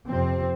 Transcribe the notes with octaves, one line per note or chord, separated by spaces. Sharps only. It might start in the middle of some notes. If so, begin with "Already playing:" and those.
F2 C3 C4